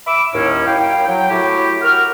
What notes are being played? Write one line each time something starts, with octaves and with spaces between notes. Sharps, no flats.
E5 B5 D6 E6
D#2 A2 C#4
F#2 A#3 E4 F5 G5
F#3 G5
A2 A3 E4 F#4 G4
F#4 A#4 F6